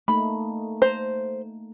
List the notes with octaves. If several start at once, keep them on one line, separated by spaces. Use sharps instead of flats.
A3 A#3 D#4 B5
C5 A#5